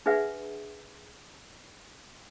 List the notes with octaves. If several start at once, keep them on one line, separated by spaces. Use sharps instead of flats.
D4 G#4 B4 E5 F#5